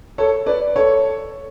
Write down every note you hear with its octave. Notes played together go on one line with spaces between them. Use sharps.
A4 C#5
B4 D5
A4 C#5